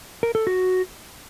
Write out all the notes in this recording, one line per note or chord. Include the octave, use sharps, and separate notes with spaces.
A#4
A4
F#4